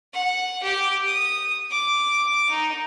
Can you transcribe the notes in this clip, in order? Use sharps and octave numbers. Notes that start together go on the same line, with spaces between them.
F#5
G4
D#6
D6
D#4